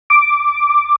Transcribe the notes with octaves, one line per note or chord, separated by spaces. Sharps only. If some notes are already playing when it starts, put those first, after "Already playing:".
D6